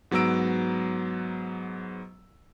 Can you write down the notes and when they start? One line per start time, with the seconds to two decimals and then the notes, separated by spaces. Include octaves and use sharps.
0.11 G#2 F#3 B3 A#5 E6 D7